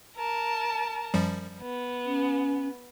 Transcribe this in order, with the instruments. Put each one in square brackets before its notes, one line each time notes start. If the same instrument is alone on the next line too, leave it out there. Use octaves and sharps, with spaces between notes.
[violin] A#4 A5
[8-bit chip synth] F#2 F3 G3
[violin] B3
[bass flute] C#4